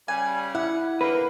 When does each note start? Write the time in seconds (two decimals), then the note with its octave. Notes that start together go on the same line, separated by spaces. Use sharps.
0.08 C#3 G3 G#5
0.55 E4 F#5
1.01 D3 A#3 B4